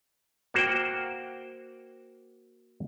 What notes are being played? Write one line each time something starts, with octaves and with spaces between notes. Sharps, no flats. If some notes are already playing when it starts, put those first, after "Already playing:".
A#3 F#4 C5 F#5 G5